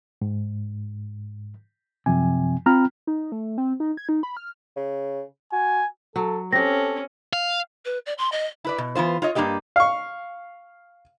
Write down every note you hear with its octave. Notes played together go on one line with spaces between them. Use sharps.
G#2
F#2 C3 F3 G#5
C4 F4 A#5 B5 F6
D#4
A3
C4
D#4
G#6
D#4
B5
F6
C#3
F#4 G#5
F#3 A4
C4 C#4 G4 A4 A#6
F5
B4
D5
C6
D#5
E4 B4 D5
B2
E3 B3 F4 C5
F4 C#5 D#5
G2 A#3 D4 G4 D#5
F5 C#6